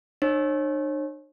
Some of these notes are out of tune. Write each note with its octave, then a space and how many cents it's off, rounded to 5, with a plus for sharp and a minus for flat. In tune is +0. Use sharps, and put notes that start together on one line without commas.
D4 +45 C#5 -40